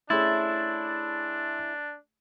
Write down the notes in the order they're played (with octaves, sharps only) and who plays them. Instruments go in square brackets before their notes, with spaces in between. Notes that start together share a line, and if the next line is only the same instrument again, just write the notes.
[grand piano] A3 C#4 G#4 [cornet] D4 [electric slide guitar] E4 [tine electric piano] C6 E6 A6